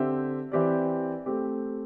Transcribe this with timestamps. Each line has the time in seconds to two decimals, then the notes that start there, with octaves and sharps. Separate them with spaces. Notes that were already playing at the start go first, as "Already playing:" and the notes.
Already playing: D3 C4 G4 E5
0.52 E3 C4 G4 D5
1.26 A3 C4 G4